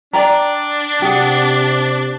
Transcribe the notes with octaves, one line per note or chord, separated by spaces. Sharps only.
D4 D5 G5 A#5
C3 G4 G#4 F#5